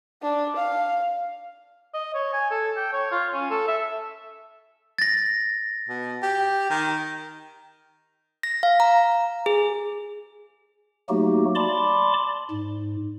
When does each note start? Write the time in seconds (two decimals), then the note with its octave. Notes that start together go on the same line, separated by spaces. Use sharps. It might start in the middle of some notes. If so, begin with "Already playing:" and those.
0.22 D4
0.56 F5
1.94 D#5
2.14 C#5
2.33 G#5
2.51 A4
2.77 G5
2.93 C#5
3.12 F4
3.34 C#4
3.51 A4
3.68 E5
4.98 A6 A#6
5.89 B2
6.22 G4
6.70 D#3
8.43 A#6
8.63 F5
8.80 A#5
9.46 G#4
11.09 F#3 A3 A#3 D#4 F#4 G4
11.55 D5 A5 B5 C6 D6
12.51 G#2